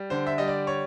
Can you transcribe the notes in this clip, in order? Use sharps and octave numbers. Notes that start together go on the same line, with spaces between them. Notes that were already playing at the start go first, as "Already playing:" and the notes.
Already playing: G3
D3 C5
E5
G3 D#5
D5
C#5